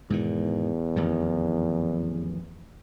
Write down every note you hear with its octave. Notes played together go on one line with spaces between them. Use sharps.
E2 G#2 B2 D#3
A1 F2 D#3